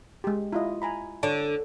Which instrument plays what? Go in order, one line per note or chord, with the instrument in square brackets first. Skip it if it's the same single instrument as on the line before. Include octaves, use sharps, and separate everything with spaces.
[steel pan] G#3 G4
E4 F4 D#5
G#5 A#5 B5
[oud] D3 [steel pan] C#5 D5 A5